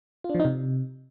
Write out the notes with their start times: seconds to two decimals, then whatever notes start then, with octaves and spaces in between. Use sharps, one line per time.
0.24 F4
0.29 D4
0.35 F3
0.40 D#4
0.45 C3